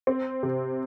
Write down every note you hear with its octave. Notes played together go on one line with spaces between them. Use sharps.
C4
C3